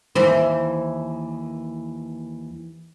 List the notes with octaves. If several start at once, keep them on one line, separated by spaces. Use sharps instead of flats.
D#2 E3 C5